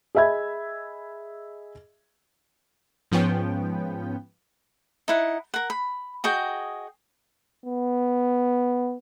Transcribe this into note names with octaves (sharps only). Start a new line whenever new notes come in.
G#4 D#5 E5 B5 G#6
G#2 F3 B3 C#4 G5
D#4 E4 F#5
A#4 F#5
B5
F#4 G#4 D#5 G5
B3